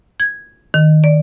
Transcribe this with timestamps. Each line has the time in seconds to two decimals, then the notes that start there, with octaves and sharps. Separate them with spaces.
0.20 G#6
0.74 D#3
1.04 D5